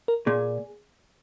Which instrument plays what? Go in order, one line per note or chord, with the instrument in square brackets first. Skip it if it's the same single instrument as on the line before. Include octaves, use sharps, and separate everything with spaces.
[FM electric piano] A#4
[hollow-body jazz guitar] A#2 [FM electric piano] G#4